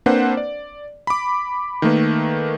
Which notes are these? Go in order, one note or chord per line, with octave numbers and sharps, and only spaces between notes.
A#3 C4 D4 B4 C5 F#5
D5
B5 D6
D#3 A3 A#3 B4